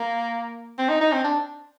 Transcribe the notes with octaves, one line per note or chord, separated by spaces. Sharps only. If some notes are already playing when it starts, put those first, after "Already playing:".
Already playing: A#3
C4
D#4
D#4
C4
D4